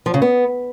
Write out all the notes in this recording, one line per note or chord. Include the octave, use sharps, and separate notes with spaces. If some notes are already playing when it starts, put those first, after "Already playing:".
F3
C#3
B3